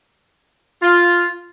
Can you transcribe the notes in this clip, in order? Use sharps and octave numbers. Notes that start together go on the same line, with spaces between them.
F4